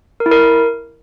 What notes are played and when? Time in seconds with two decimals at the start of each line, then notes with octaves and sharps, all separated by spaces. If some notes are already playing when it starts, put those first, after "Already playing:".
0.20 A#4
0.26 E4
0.31 A#4